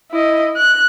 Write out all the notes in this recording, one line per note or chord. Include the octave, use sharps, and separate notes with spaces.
E4 D#5
F#6